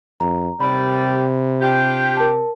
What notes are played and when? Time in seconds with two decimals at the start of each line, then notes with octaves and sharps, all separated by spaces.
0.20 F2 A#5
0.60 D#2 C3 G3 B5
1.62 D4 F4 G4
2.17 A#4 A5